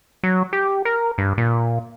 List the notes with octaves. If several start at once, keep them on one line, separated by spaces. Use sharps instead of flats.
F#3
G4
A#4
G2
A#2